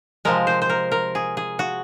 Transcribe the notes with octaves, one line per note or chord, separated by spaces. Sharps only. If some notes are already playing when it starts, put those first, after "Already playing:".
C3 F3 G#3 A#4
C5
C5
A#4
A#4
G#4
G#4
F#4